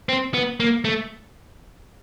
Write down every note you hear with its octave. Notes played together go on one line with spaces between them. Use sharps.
C4
B3
A#3
A3